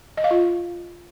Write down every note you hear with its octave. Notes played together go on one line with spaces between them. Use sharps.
D#5
F5
F4